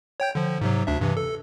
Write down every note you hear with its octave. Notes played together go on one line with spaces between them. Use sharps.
C#5 G5 G6
D3 F3
G#2 C3 F#3
D2 D4 E5
G2 C3 E3
A4